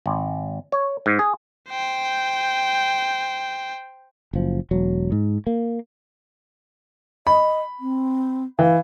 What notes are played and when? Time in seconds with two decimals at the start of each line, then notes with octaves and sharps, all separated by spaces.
0.06 G#1
0.72 C#5
1.06 G#2
1.19 G#4
1.69 C5 G5
4.33 F#1 F3
4.71 E1 F#3
5.12 G#2
5.47 A#3
7.27 D#5 B5
7.79 C4
8.59 E3 F5